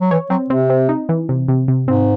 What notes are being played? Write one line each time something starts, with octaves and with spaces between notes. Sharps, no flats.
F#3
E3 C#5
F#3 C4
C3 C4
C4
D#4
E3
C3
C3
C3
G#2 C4